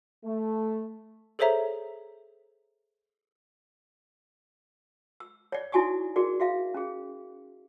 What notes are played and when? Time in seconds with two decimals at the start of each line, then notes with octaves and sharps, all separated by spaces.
0.25 A3
1.39 G#4 A4 C5 C#5 E5 A#5
5.20 E6
5.52 C#5 D5
5.72 D#4 E4 F#4 G#5 C#6 D#6
6.16 F#4 G#4 A#4 D5
6.40 F#4 E5 F5
6.74 C#4 G#4